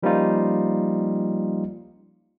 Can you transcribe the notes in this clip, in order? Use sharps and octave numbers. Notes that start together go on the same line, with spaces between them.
F3 G3 A#3 C#4 D#4 F4